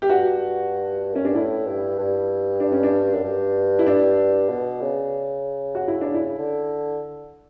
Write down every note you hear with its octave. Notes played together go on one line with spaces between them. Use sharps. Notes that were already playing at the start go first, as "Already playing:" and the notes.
G4
G2 F#4
F#2 C#4
G2 D4
A2 E4
G2
G2
D4
C#4
D4
F#2
G2
E4
D4
B2
C#3
F#4
E4
D4
E4
D3